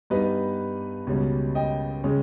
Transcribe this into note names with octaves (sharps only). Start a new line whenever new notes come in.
G2 G3 B3 D#4 B4 D#5
C#2 B2 G3 C#4
D#5 G5
C#3 G#3 C#4